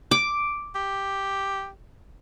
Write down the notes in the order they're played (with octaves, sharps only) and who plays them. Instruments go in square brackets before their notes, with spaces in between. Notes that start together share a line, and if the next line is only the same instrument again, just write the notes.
[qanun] D6
[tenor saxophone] G4